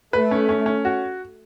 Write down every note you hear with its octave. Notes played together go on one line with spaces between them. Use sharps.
A3 B4
C#4
C#4
C#4
F#4